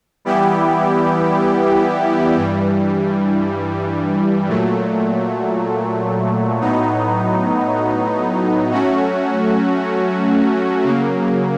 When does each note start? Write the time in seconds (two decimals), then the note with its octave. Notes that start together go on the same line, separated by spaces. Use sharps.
0.25 E3 G3 B3 E4 G4
2.37 G2 E3 G3
4.48 A#2 F#3 A3
6.61 A2 F#3 B3 D#4
8.72 F#3 A3 C#4 F#4
10.84 C#3 F#3 A#3